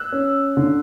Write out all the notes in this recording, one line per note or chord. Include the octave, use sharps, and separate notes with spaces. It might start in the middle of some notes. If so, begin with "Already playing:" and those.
Already playing: E6 F#6
C#4
D3